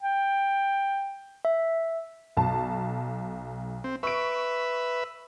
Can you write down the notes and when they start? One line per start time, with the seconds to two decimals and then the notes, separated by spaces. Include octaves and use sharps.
0.01 G5
1.45 E5
2.37 B1 A5
3.84 C4
4.03 B4 E5 C#6 D7